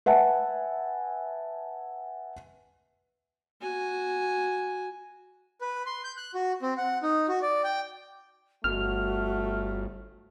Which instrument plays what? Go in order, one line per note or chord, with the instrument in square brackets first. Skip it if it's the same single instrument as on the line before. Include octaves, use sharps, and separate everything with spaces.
[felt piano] B4 E5 F#5 G#5 A5
[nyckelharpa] F#4 G#5
[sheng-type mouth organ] B4
C6
G6
F#6
F#4
C4
F#5
D#4
F#4
D5
G5
[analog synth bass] G1 [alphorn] A3 [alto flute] F#4 [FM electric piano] F6